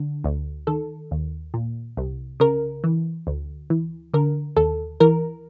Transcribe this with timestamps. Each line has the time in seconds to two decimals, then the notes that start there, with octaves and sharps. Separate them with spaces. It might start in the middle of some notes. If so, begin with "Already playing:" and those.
Already playing: D3
0.24 D2
0.67 D#3 A4
1.11 D#2
1.54 A#2
1.97 C2
2.40 C#3 A#4
2.84 E3
3.27 D2
3.70 E3
4.14 D3 A#4
4.57 D#2 A4
5.00 E3 A#4